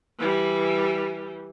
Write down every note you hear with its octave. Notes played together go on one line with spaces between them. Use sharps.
E3 G3